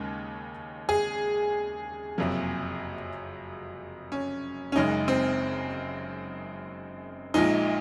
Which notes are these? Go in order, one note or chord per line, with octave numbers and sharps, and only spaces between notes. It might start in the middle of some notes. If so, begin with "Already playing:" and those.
Already playing: D#2 C#3 G#3
G#4
F#1 F2 C3 F#3 A#3
C#4
C#4
F#1 F#2 C#3 G#3 D#4
C4
A#1 A#2 F3 G#3 D#4